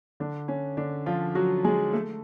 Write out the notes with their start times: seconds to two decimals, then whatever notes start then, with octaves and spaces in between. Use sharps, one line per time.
0.20 D3 D4
0.48 C#4
0.77 D3 D4
1.06 F3 F4
1.35 F#3 F#4
1.64 G#3 G#4
1.93 A3 A4